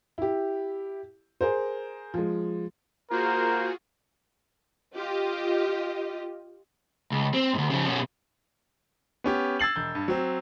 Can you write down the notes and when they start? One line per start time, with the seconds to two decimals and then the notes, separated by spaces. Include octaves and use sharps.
0.18 E4 G4
1.41 G#4 A#4 C5
2.14 F3 G#3
3.11 A#3 F4 F#4 G#4 A#4 C5
4.96 F4 G4 D#5
7.12 C#2
7.34 C4
7.54 D2 G#2
7.70 C#3 F3
7.87 B2 C#4
9.24 B3 C#4 G4
9.59 E6 G#6 A6 C7 F#7
9.76 E1 G6
9.95 G2
10.08 F#3 C4